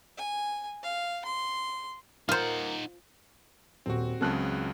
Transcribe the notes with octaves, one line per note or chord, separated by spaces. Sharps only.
G#5
F5
C6
D#4 F4 A#4 C5 F#5
D#1 C4 F#4
C#2 C#3 F#3 C4 A5 F#6